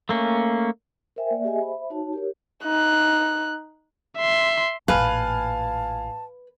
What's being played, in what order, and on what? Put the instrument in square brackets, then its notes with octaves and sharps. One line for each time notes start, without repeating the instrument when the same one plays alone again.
[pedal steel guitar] A3 A#3 C#4
[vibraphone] A#4 C5 E5 G5 G#5
A#3 D5 E5
G4 G#4 D#5 E5 G#5
C5 E5 B5
D#4 F#4 C#5 A5
G4 A#4 C#5
[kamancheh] D#4 F#6
[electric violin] E5 C6
[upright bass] A1 A#2 [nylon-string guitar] B4 [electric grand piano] F5 G#5 F6 [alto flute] A5